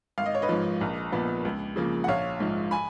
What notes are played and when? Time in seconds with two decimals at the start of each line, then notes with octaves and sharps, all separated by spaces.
0.18 G#1 F5
0.26 D#5
0.35 C#5
0.42 B4 D#5
0.49 G#2 F3
0.81 A#1
1.12 A#2 F3 B3
1.45 C#2
1.76 C#3 F3 A#3
2.04 F#5
2.08 A#1 C#5 F5
2.40 G#2 F3
2.71 G#5 B5